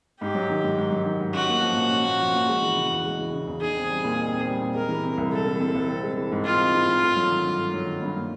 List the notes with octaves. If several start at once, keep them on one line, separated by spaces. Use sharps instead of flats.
G#2 G4
F#3
D#3
G#2
G#2
F#3
D#3
G#2
C#4 F#4
A#3
F3
A#2
C#4
A#3
F3
A#2
G#3
E3
C#3
E2
G#3
E3
C#3
E2
D#4 G#4
C4
G3
A#2
D#4
C4
G3
A#2
G#3 A#4
E3
C3
C2
G#3 A4
E3
C3
C2
C4
G#3
E3
G#2
C4 F4
G#3
E3
G#2
A3
F#3
D#3
G2
A3
F#3
D#3
G2
A#3